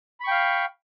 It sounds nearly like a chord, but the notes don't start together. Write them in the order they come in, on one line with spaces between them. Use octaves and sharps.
B5 C#6 G5 F5